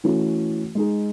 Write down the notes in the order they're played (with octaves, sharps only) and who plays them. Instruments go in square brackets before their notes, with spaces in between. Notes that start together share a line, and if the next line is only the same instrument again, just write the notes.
[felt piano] E3 A3 C#4 F#4
G#3 D#4 G#4